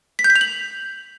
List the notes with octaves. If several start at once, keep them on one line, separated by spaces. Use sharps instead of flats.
B6
G6
B6
F7
F#7